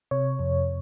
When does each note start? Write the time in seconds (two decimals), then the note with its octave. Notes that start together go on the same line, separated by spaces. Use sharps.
0.11 C3 C#5
0.39 F2